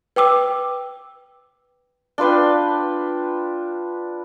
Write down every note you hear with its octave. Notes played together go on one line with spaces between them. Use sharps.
B4 G5 D6 E6
D4 F4 B4 G5